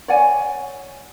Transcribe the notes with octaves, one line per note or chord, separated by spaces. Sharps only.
C#5 D5 F#5 G#5